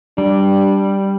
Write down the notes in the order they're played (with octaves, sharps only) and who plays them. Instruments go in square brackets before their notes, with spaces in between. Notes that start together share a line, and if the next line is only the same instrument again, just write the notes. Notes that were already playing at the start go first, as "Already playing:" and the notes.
[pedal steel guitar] G3 [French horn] D4